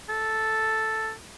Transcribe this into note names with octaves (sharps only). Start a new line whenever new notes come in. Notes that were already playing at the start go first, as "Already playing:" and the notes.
A4